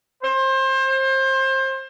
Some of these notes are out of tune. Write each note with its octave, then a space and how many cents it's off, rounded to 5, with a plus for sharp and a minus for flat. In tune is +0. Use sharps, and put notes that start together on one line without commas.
C5 +25